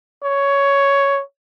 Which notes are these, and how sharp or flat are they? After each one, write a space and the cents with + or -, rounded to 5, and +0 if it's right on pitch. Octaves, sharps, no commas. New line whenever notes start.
C#5 +10